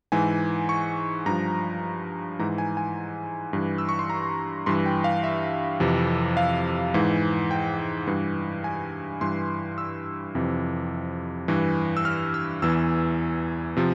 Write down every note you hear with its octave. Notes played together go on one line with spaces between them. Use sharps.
G#2 E3 G#5
C#6
G2 F3 A#5
G#2 E3 A#5
G#5
G#5
G2 E3
E6
C#6
C6
A#5
G2 E3 C6
G5
F5
E5
F2 C3 E3
F5
G#2 E3
G5
G2 E3
G#5
G2 E3 C6
E6
F2 C3 E3
G2 E3
E6
F6
E6
E2 E3 E6
C3 F3